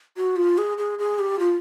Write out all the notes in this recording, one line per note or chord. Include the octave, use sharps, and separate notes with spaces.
F#4
F4
G#4
G#4
G#4
G4
F4